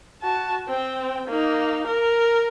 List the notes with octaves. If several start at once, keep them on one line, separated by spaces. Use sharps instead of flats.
F#4 A5
C4 G5
A#3 D#4
A#4